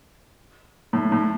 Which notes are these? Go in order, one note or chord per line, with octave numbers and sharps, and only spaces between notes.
A2
A2